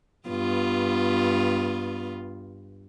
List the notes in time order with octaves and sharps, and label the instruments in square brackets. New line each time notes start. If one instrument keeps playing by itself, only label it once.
[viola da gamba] G2 B3 F4